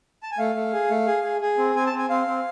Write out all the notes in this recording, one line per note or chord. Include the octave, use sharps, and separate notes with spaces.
A5
G#5
A3 F5
A3
G#4
A3
G#4
G#4
G#4
C4
C4 G#5
A5
C4 G#5
C4 F5
C4